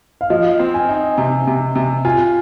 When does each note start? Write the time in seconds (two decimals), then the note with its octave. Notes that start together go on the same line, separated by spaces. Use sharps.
0.21 F5
0.30 F3 D#5
0.59 C4
0.74 G#5
0.89 D#4
1.18 C3
1.47 C3
1.75 C3
2.05 F4 G#5